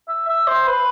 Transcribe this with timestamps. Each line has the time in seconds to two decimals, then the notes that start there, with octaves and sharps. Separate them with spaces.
0.08 E5
0.28 E5
0.47 C5
0.67 B4